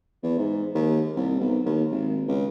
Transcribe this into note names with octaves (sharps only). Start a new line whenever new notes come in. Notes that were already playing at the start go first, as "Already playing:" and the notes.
E2
G#2
D#2
C2
B1
D#2
G#1
C#2